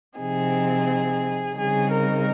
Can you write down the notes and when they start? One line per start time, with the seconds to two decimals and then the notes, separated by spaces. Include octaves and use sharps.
0.18 C3 F3 C4 D#4 G#4
1.55 C#3 G3 C4 D#4 G#4
1.89 A#4